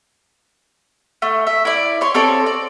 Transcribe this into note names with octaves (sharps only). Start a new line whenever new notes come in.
A3
E5
E4 D5
C#5 C6
C4 A4 C#5 D5
D5